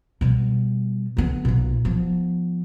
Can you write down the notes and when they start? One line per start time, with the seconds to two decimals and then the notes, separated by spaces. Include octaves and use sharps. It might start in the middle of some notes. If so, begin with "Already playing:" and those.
0.21 B2 G3
1.17 D3 B3
1.45 B1 A#2
1.85 F3 B3